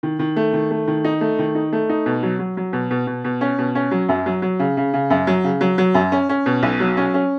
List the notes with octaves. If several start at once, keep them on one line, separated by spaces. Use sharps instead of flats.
D#3
D#3
A3
D#3
A3
D#3
D#4
A3
D#3
D#4
A3
D#4
B2
F#3
F#3
F#3
B2
B2
B2
B2
C#4
B2
C#4
F#3
F#2
F#3
F#3
C#3
C#3
C#3
F#2
F#3
C#3
F#3
F#3
F#2
C#4
C#4
B2
B1
F#3
C#4
C#4